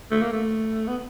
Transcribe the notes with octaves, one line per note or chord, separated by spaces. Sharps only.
A3
A#3
A3
B3